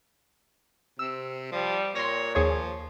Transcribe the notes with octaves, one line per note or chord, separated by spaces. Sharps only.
C3 C4 E6
F3 G3
A#2 C#5 C6 A#6
D#2 F3 G#4 C#5